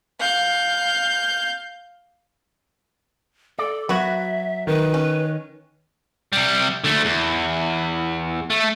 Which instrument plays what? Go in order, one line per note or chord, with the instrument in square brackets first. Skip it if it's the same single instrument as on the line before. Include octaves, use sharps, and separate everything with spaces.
[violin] F5 G6
[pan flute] A4 [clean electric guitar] D5
[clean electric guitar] F#3 [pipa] B3 F#4 [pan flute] E5
[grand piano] D#3 [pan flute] B4
[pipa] C#4
[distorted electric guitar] C3 G3
D3 A3
E2
A3